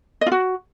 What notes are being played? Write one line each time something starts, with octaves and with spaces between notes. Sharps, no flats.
D#5
F4
F#4